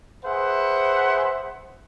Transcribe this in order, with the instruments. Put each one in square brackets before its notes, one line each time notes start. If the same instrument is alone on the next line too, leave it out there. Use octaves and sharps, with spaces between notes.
[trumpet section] G#4 B4 C5 E5 F#5